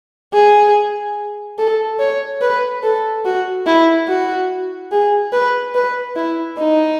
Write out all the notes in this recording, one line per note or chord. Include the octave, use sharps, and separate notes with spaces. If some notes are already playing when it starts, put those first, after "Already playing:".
G#4
A4
C#5
B4
A4
F#4
E4
F#4
G#4
B4
B4
E4
D#4